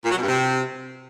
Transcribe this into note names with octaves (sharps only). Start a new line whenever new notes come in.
A#2
F#3
B2
G2
C3